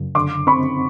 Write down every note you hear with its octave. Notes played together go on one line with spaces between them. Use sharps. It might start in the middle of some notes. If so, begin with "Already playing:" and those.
Already playing: F#2 C#3
D3 C6 D6
C4 B5 C#6